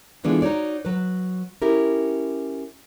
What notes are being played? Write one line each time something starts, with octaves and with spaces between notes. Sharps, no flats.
D3 E3 G#3 B3 D4 F4
D#4 F#4 C#5 D5
F#3 B4
C#4 E4 G4 A#4